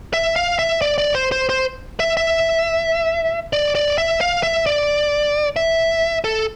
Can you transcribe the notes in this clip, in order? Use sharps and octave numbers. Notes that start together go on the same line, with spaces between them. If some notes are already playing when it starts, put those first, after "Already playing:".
E5
F5
E5
D5
D5
C5
C5
C5
E5
E5
D5
D5
E5
F5
E5
D5
E5
A4